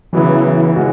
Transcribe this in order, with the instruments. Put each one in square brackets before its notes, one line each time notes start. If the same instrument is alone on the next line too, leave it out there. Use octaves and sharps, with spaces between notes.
[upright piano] C#3 F#3 B3 E4 [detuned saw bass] E3
[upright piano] C#3 G#3 C#4 F#4